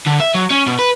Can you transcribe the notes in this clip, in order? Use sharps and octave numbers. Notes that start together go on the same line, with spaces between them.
D3
E5
F#3
C#4
B2
B4